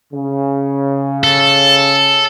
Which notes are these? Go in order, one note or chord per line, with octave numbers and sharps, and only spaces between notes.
C#3
A4